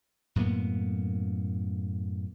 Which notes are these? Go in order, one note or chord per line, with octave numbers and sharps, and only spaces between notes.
F#2 A2 A#3 B3